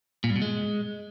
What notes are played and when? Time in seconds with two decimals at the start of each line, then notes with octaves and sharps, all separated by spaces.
0.24 A#2
0.30 G2
0.36 B2
0.42 G#3